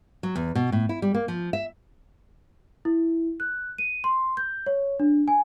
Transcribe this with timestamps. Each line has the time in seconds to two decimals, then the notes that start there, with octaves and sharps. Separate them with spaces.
0.23 F#3
0.36 E2
0.55 B2
0.72 A2
0.89 E4
1.02 G3
1.14 A#3
1.28 F3
1.53 E5
2.85 E4
3.40 F#6
3.78 D#7
4.04 C6
4.37 G6
4.66 C#5
5.00 D4
5.28 G#5